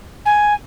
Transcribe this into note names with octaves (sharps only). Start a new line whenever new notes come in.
G#5